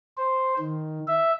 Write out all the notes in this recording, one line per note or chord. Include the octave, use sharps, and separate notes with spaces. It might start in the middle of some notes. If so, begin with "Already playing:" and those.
C5
D#3
E5